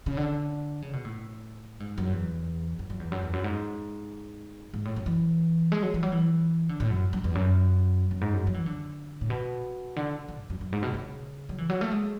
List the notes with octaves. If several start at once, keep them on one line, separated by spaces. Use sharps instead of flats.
C#3
D3
C#3
B2
A2
G#2
F#2
E2
F#2
F#2
E2
F#2
E2
F#2
G#2
G#2
A2
F#2
E3
G#3
F#3
E3
F#3
E3
D3
A2
F#2
F#2
E2
F#2
F#2
G#2
F#2
F#3
E3
D3
A2
B2
D3
D3
F#2
F#2
F#2
G#2
B2
C#3
F#3
E3
F#3
A3
G#3